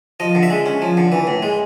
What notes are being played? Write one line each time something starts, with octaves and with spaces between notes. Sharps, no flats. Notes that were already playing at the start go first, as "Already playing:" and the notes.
F3 D#5
D3
E5
G#3
C#4
F3
D3
E3
A2
G#3